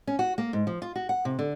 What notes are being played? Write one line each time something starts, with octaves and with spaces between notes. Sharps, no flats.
C#4
F#4
A#3
G#2
F3
F4
F#4
F#5
C3
D3